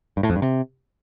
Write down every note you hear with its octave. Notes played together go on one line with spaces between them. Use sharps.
G2
A2
F2
G2
C3